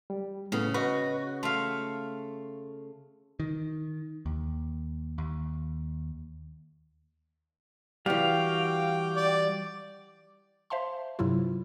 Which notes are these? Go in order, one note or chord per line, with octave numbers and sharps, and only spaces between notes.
G3
A2 C#3 B3
F#4 B4 D#5
A3 F5 C6
D#3
D#2
D#2
E3 G3 F#4 F5 G5 D6
D5
C5 E5 F5 A5 C6
G2 C3 F#3 E4 F4